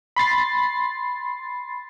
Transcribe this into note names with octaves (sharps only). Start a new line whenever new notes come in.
B5 C6 A6 C7